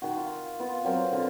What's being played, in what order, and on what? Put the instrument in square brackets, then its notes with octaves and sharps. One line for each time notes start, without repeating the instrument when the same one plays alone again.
[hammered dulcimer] D#3 F#4
F4
B3 F4
F#3 C4 A#4
D3 F4